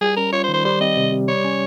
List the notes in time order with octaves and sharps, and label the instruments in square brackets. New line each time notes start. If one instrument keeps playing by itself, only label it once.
[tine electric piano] G3 [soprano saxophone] G#4
[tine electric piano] C#4 [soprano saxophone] A#4
[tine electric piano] F4 [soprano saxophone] C#5
[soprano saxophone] C5
[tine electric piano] D#3
[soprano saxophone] C5
[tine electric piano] G3 [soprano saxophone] C5
[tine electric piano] C4 [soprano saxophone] D#5
[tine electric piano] C3
C3
[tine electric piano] G3 [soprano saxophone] C#5
[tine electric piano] C#4